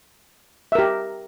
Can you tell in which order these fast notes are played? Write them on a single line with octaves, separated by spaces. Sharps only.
E5 A#4 G4